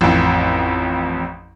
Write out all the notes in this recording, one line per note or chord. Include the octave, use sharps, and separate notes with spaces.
A1 F2